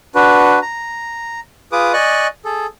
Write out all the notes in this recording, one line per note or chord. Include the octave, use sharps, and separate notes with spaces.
D4 F#4 B4
A#5
F4 G#4 B4 D6 D#6
D5 D#5 G#5 C#6 F#6
G#4 A4